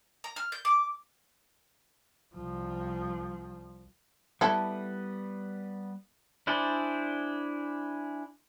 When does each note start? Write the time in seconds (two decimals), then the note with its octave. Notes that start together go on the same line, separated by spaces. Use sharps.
0.24 A#5
0.36 F6
0.52 G6
0.65 D6
2.34 C2 F3
4.41 G3 A3 B3 E4 A4
6.47 D4 E4 G#4 C5 D5